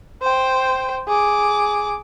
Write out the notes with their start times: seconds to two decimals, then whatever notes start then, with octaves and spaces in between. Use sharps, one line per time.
0.22 C5 G5
1.08 G#4 D6